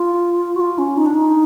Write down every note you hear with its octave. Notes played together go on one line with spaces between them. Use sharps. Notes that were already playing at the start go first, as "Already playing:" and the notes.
Already playing: F4
F#4
F4
C#4
D#4
D4
D#4